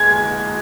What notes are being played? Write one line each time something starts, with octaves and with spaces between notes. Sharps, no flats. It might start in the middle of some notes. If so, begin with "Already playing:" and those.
Already playing: G#3 G#6